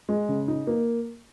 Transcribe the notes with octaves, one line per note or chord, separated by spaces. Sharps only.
G#3
C#3
D#4
A#3